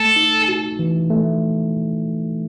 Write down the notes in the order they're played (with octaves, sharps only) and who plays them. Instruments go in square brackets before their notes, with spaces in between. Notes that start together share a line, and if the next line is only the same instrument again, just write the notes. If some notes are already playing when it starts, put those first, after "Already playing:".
Already playing: [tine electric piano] A3 [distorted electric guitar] A4
[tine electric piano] D#4
F#4
E3
A3